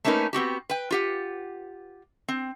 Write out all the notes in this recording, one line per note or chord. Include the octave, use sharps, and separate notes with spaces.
A3 A#3 C#4 D#4 A#4 B4
B3 C4 F#4 G4
B4 G5
F4 G4 F#5
C4